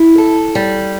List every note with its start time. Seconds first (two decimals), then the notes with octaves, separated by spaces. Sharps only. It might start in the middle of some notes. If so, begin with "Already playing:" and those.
Already playing: E4
0.18 A4
0.55 G3